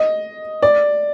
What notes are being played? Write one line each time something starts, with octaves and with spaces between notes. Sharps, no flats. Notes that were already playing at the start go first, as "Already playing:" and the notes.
Already playing: D#5
D5